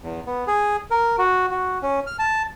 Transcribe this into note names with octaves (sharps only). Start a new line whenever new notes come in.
E2
B3
G#4
A#4
F#4
F#4
C#4
F6
A5